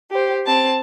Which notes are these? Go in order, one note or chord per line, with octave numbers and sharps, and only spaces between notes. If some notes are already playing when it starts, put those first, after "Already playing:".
G4 C5
C4 A5